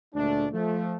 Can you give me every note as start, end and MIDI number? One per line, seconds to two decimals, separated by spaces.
0.15 0.47 38
0.15 0.47 46
0.15 0.47 56
0.15 0.47 57
0.15 0.47 62
0.53 0.97 53
0.53 0.97 57